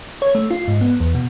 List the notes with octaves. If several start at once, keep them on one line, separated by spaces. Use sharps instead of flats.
C#5
A3
F4
G#2
B3
E2
B2